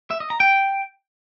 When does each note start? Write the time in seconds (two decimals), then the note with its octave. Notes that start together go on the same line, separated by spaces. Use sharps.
0.11 E5
0.20 D#5
0.30 A#5
0.40 G5